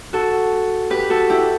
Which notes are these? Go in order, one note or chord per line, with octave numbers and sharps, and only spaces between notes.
F#4 A4
G4 B4
F#4 A4
E4 G4